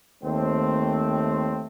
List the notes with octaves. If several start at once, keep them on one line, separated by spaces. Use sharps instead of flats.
D#2 A3 C4